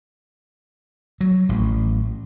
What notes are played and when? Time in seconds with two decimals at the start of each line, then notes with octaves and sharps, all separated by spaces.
1.21 F#3
1.49 A1